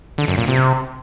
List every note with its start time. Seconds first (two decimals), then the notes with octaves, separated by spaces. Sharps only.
0.18 D3
0.28 F#2
0.38 A#2
0.48 C3